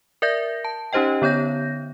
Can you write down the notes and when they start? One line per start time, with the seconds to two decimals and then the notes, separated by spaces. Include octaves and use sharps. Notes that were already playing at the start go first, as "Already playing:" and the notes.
0.22 A#4 D5 E5 G6 A#6
0.65 A5
0.93 C#4 D#4 G4 C5 D#5 G5
1.22 D3 B3 C#5 G6 A#6